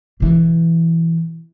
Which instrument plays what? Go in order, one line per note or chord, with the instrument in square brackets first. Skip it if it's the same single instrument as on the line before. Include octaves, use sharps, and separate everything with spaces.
[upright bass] B2 E3